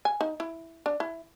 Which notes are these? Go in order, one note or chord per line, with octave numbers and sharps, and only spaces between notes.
G#5
D#4
E4
D4
E4